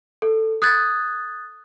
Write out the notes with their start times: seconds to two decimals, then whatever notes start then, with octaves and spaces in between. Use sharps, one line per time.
0.22 A4
0.62 D#6 F#6 G#6 A6